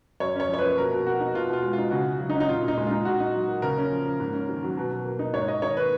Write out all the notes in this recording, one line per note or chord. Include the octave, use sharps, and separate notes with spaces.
F#2 C#5
C#4 C#5
F3 C#5
A#3 B4
B2 A#4
B2
A#3 F#4
D#4
B2 F4
B2 F4
G#3
D#4 F4
C#3 F#4
C#3
F#3
D#4
C#4
D#4
A#2 F4
A#2 D#4
G#3
D#4 F4
A#2 F#4
D#4
F#3
A#3
C#3 A#4
C#4
F3
A#3
G#2
C#4
D#3
F#3
B2
B2
A#3
D#4
G#2 C#5
G#2 D#5
D#3 C#5
A#3 B4